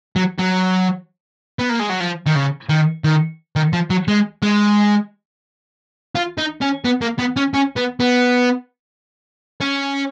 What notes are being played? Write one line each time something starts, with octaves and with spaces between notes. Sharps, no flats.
F#3
F#3
B3
A#3
G#3
F#3
F3
D#3
C#3
D#3
D#3
D#3
F3
F#3
G#3
G#3
F4
D#4
C#4
B3
A#3
B3
C#4
C#4
B3
B3
C#4